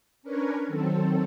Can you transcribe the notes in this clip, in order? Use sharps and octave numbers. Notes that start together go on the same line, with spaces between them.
C#4 D4 A#4 B4 C#5
D#3 F#3 C4 A4